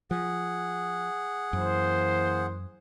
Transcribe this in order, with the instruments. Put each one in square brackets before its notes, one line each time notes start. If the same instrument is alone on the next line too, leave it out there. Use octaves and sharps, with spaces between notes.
[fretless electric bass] F3 [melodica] G#4 F#5
[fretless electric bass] F#2 [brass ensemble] E3 A#3 C5